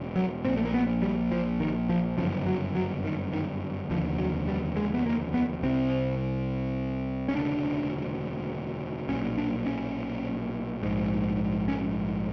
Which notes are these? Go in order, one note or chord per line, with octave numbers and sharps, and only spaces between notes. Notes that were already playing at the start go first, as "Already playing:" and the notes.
Already playing: E1 C#3
F#3
A#1 A#2 C4
A3
A#3
B3
G3
F3
D#3
F3
G1 F#2 C#3 F3
F#3
F#3
D#3
D#3
F1 D#2 D3 F3
F#3
G3
G#3
B3
A#3
B3
C2 C3 C4
C#4
E1 D2 C#3 D4
B1 A#2 C#4
D4
C#4
A#1 G#2
C#4